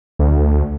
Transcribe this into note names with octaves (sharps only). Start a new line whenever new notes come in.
D2